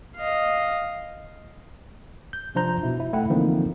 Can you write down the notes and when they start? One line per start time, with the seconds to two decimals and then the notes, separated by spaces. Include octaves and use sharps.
0.16 D#5 F5
2.33 G6
2.55 C3 F3 D4 C5 A#5 G6
2.83 B2 E4
3.00 E4
3.13 A3 E4 E5 F#5 G5
3.30 D3 E3 F3 A#3 C4 D#4